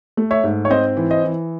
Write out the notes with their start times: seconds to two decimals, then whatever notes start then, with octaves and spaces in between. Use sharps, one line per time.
0.17 A3
0.31 C#5 E5
0.44 G#2
0.65 C#5
0.70 C4 C5 D#5
0.97 E3
1.11 C5 D#5
1.24 E3